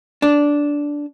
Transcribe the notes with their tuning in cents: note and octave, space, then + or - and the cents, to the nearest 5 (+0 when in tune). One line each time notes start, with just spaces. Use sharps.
D4 -10